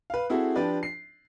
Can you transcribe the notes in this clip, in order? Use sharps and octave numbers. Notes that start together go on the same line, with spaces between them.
B4 F5
C4 E4 F#4 G#4 A4
F3 D4 G4 B4 D5
C7